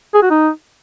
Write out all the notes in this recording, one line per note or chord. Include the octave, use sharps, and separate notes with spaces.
G#4
F#4
D#4